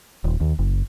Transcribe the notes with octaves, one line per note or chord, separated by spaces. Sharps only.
D#1
D#2
F#1